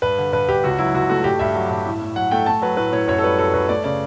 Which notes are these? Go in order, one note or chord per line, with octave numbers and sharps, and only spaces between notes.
G2 B4
D3
G2 B4
G2 G4
C#2 F#4
F#3 E4
C#2 F#4
A3 F#4
G2 G4
G2 E5
F#3
G2
A2
A2
F#3 F#5
A3 G5
A3 A5
F#3 B4
A2 B4
A2 C#5
F#2 C#5
A4
G3 B4
F#2 A4
F#2 B4
A3 D5
C#3 D5